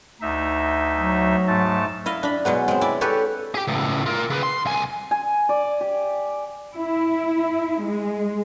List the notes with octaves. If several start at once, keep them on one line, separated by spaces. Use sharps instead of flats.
D2 D#4 E5
F#3
G#2 A3 A5
E4 D#5 F5
D4 B5
B2 F#3 G#3 B3
G#3 C4
E4 D5
G4 A4 B4 C#5 E5
G4 G#4
C#2 A2
F4 A#4
C#3 B4
C6
C2 G#5
G#5
D5
G4
E4
G#3